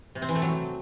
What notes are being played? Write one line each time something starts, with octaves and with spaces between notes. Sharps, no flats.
C3
C4
E3
A3
F#3